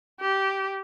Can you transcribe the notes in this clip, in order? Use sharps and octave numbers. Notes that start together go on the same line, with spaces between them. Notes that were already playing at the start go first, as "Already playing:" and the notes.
G4